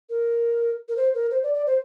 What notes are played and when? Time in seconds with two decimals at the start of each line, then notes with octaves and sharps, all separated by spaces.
0.10 A#4
0.88 A#4
0.97 C5
1.14 A#4
1.31 C5
1.43 D5
1.54 D5
1.66 C5